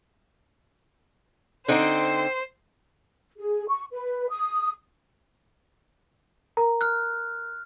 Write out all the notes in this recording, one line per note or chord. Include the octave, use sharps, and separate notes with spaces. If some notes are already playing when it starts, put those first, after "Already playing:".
D3 C4 D#4 C5
G#4
C#6
B4
D#6
A#4 A#5
F6 F#6